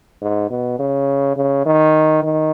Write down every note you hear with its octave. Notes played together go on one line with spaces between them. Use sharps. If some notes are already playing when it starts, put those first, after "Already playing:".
G#2
B2
C#3
C#3
D#3
D#3